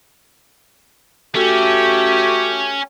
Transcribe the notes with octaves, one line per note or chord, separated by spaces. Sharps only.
A3 C#4 F#4 G4